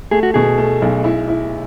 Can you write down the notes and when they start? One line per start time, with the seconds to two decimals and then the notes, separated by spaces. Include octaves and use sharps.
0.11 A3 G#4
0.23 F#4
0.34 B2 G#4
0.58 A3
0.82 B1
1.04 E4
1.28 E4